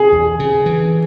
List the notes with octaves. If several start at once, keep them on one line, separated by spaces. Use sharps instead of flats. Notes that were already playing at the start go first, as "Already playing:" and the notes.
Already playing: G#4
E2
C#3
E3